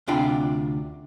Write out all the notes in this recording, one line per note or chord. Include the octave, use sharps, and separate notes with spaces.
D2 C3 D4 F4 G5 B5